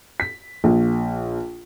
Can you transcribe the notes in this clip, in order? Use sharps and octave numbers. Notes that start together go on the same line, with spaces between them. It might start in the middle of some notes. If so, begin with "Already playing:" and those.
B6
A#1